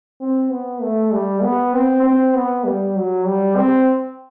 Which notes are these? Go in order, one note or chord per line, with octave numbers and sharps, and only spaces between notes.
C4
B3
A3
G3
B3
C4
C4
B3
G3
F#3
G3
C4